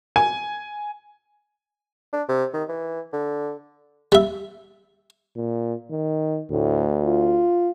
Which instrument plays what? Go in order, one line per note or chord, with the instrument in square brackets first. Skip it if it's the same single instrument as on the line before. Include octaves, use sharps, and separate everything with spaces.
[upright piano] G#5
[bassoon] D4
C3
D#3
E3
D3
[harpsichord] G3 E5
[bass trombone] A#2
D#3
[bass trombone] D2 [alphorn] A2
[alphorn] F4